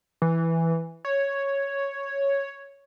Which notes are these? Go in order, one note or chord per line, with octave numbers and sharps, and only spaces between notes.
E3
C#5